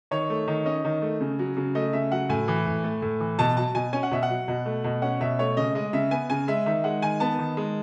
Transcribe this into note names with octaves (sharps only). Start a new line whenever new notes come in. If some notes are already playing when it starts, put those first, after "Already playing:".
D#3 C#5
A3
D#3
C#4 D#5
D#3
A3
C#3
F#3
C#3
A3 D#5
C#3 E5
F#3 F#5
A2 G#5
E3
A2
A3
A2
E3
B2 A5
F#3 A5
B2 G#5
C#4 G#5
F#5
B2 E5
F#5
F#3
B2
A3
B2
C#4 F#5
B2 E5
A3 C#5
C#3 D#5
G#3 D#5
C#3 E5
B3 G#5
C#3 G#5
G#3 E5
D#3 E5
G#3 F#5
D#3 G#5
B3 A5
D#3
G#3